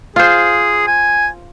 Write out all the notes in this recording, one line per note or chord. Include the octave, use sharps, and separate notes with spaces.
F4 G#4 C5
G#5